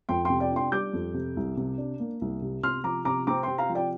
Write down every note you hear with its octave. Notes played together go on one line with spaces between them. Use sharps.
F2 G5 C6
C3 G5 C6
D5 G5
D4 G5 C6
G3 D6 G6
F2
C3
C2
C3
D4
A#3
C2
C3
C3 C6 F6
F3 A#5 D6
C3 A#5 D6
C4 A#5 D6
C3 G5 C6
F5 A#5
F3
D5 G5